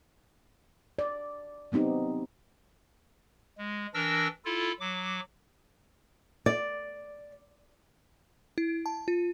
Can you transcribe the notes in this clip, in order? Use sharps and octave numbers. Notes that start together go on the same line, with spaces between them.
D5
F#3 B3 C4 D#4 G4
G#3
E3 D4 A#4 E6 A#6
E4 F4 A4
F#3 D6
D5
E4
A5
F4